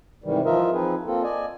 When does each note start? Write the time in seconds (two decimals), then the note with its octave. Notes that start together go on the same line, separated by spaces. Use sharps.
0.24 G#2 C3 D#3 E3 G3
0.45 E3 F3 F4 A#4 D#5 E5
0.73 F3 C4 D#4 G#4 B4
1.06 A#3 C4 F4 A4
1.23 D5 D#5 G#5